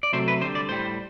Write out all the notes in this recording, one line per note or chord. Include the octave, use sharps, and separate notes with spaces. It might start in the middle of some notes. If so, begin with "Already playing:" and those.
D5
C3 F#3 A3 C5
B4
D3 G3 C5
D5
A2 G3 C5